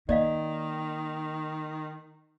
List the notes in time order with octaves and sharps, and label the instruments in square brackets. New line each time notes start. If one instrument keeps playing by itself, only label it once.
[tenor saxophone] D#3 [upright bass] A#3 [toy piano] D5 D#5 F5